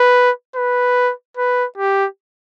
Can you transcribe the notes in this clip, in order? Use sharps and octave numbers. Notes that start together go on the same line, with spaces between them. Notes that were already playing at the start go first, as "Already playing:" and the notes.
Already playing: B4
B4
B4
G4